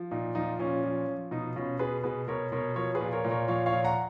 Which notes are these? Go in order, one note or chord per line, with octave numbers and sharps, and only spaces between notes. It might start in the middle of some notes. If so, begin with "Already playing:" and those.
Already playing: F3
A#2 D#4
F3 D#4
A#2 C#4
F3
F3
B2 D#4
B2 C#4 F4
B2 G#4 B4
B2 G#4 B4
B2 A#4 C#5
B2 A#4 C#5
F3 A#4 C#5
G#4 B4
A#2
A#4 C#5
A#2
A#4 C#5
F3 C#5 F5
C#5 F5
A#2
F#5 A#5